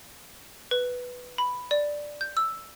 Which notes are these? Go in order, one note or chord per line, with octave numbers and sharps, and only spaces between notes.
B4
B5
D5
G6
E6